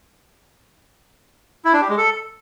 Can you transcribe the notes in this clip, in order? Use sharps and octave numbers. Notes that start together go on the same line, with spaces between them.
E4
D4
G4
G#3
A4